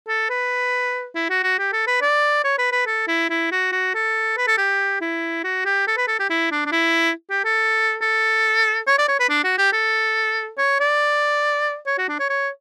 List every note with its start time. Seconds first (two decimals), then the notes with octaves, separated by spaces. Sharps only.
0.08 A4
0.30 B4
1.15 E4
1.30 F#4
1.43 F#4
1.59 G4
1.73 A4
1.87 B4
2.02 D5
2.44 C#5
2.58 B4
2.72 B4
2.87 A4
3.08 E4
3.29 E4
3.52 F#4
3.72 F#4
3.94 A4
4.37 B4
4.48 A4
4.58 G4
5.01 E4
5.44 F#4
5.65 G4
5.88 A4
5.97 B4
6.08 A4
6.19 G4
6.30 E4
6.52 D4
6.66 D4
6.72 E4
7.30 G4
7.45 A4
8.01 A4
8.87 C#5
8.98 D5
9.08 C#5
9.20 B4
9.29 D4
9.44 F#4
9.58 G4
9.73 A4
10.58 C#5
10.80 D5
11.87 C#5
11.98 F#4
12.09 D4
12.20 C#5
12.30 C#5